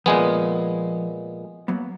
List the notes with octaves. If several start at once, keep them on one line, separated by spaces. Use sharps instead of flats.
A#2 F3 G#3 B3 G#5
F#3 A#3 B3